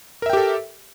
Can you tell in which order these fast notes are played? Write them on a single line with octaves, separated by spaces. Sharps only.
A#4 E5 G5 G4 A4